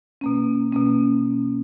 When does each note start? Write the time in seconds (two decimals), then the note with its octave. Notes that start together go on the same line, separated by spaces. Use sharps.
0.21 B2 A#3 C#4
0.72 B2 A#3 C#4